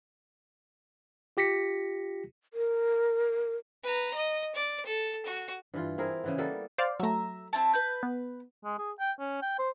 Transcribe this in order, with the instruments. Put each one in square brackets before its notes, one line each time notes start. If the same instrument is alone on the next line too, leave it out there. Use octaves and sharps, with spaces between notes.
[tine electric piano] F4 G4 A#6 B6 C#7
[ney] A#4
[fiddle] B4 A#5
D#5
D5
A4
F#4
[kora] G2 E3 F4
C4 E4 G#4 A#4
C#3 E3 B3
G3 A#3 B3 A4
[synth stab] C5 D5 F5
[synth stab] F#3 A3 [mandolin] E5 A#5
[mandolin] C4 E4 A5
B4 G6
[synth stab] B3
[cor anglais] G#3
G#4
G5
C#4
G5
C5